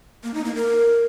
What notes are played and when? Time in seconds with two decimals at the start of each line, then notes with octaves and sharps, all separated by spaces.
0.24 A#3
0.34 D#4
0.44 A#3
0.55 A#4